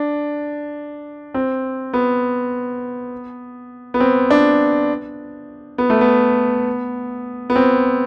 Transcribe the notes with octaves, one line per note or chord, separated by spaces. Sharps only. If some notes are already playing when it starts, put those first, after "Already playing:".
Already playing: D4
C4
B3
B3
C4
D4
B3
A3
B3
B3
C4